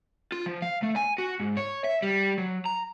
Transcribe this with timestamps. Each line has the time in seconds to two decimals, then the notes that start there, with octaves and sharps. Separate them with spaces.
0.32 F4
0.46 F3
0.62 F5
0.83 A3
0.96 G#5
1.18 F#4
1.40 G#2
1.57 C#5
1.84 E5
2.02 G3
2.38 F#3
2.66 A#5